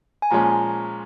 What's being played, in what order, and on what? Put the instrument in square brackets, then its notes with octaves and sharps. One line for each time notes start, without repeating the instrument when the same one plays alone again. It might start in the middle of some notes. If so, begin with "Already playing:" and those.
[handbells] G#5
[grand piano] A#2 F3 G#3 C#4 [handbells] A#5